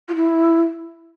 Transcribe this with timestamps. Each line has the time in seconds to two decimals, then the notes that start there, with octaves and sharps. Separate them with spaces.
0.08 F4
0.15 E4